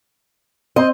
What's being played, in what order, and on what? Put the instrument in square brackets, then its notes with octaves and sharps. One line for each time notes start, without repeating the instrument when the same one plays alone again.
[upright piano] C4 C5 [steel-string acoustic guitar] D#5